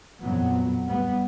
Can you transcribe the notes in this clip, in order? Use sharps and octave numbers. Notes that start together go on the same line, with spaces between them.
F2 A#2 F#3 B3
G3 B3